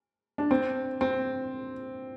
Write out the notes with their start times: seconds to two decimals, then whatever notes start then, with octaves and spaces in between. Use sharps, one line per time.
0.38 D4
0.51 C4
1.01 C4